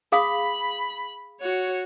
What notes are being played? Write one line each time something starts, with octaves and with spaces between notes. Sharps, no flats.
G#4 F5 B5 D#6
F#4 C#5